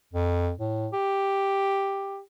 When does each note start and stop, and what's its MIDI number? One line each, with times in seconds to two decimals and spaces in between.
0.13 0.51 41
0.58 0.88 45
0.93 2.20 67